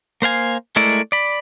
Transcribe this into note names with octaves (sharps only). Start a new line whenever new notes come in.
A#3 C5 F5 G#5
G#3 A3 E4 A#4 D5
D5 B5